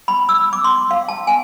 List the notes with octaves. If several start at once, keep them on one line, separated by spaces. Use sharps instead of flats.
B5
E6
D6
C6
F5
A5
G#5